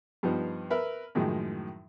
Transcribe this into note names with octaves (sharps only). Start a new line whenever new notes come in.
G2 F3 B3 D#4
A#4 B4 E5
F#2 A2 D#3 F3 G#3